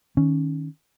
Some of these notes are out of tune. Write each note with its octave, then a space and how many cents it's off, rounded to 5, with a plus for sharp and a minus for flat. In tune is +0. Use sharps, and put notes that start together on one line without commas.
D#3 +0 C#4 +0